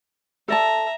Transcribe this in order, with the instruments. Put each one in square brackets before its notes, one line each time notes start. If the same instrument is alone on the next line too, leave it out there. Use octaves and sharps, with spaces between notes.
[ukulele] A4 D5 A5 [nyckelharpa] E5 A#5